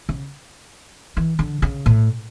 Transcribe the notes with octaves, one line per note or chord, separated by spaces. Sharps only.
C#3
E3
D3
C#3
A2